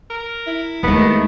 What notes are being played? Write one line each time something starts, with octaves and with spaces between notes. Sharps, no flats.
A#4
E4
D#2 D#3 G#3 A3 B3